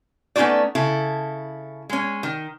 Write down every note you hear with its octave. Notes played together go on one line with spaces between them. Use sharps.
A3 B3 C#4 D#4 F#4 D5
C#3 E4 A4
G#3 C#4
D#3